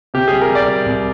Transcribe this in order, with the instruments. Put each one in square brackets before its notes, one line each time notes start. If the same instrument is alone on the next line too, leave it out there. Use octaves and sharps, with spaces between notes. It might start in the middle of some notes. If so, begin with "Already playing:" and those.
[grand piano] C3 G4
G3 G#4
A#4
G3 D5
G3
C2